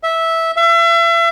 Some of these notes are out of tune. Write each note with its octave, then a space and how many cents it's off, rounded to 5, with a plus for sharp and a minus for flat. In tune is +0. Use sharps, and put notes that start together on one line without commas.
E5 -10
E5 +35